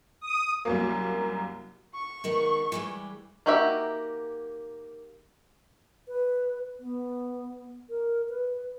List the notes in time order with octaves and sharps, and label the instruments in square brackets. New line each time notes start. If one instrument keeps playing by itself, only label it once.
[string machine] D#6
[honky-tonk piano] C2 F#2 A#3
[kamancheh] C#6
[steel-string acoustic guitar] D#3 G#3 B3
E3 G3 G#3
[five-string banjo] A#3 D#4 F#4 G4 E5
[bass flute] B4
B3
A#4
B4